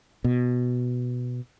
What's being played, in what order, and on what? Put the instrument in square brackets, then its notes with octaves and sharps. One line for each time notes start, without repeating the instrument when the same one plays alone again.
[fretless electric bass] B2